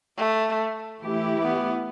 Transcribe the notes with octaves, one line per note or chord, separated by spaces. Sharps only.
A3
E3 A3 E4 G4
B3